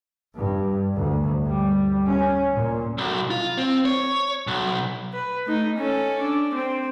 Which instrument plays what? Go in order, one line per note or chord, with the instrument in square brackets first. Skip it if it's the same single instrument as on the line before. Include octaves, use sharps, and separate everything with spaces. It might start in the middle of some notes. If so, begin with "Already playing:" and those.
[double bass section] G2
D2
G3
C#4
A#2
[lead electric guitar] B1
F4
C4
C#5
B1
[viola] B4
A3 D#4
C#4 A4
D4
C4